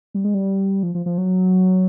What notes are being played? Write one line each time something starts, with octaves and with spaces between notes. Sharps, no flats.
G3
G#3
G3
F3
F3
F3
F#3